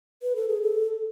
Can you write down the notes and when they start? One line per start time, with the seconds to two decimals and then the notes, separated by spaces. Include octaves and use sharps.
0.23 B4
0.36 A4
0.49 G#4
0.62 A4